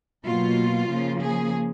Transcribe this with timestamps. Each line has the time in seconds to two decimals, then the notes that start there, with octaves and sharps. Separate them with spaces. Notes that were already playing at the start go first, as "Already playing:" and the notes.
0.23 B2 F#3 A#3 F4
0.89 C#3 F3 A#3
1.21 G#4